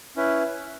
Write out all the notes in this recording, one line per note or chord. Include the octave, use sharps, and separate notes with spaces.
C#4 E4 B4